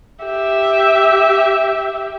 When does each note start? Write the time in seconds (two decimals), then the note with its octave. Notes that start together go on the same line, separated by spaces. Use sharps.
0.25 G4 E5